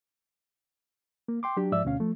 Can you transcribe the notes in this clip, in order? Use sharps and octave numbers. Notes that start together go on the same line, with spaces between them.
A#3
G5 C6 D6
F#3 D4 G4
G#2 F3 D5 E5 E6
D2 B2 C#4 F5
F3 A3